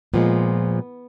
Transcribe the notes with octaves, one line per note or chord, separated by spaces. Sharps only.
A#2 F3 G#3 B3